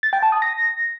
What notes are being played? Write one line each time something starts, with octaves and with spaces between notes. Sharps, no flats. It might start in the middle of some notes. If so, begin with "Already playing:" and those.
A6
G5
A5
D#6
A#6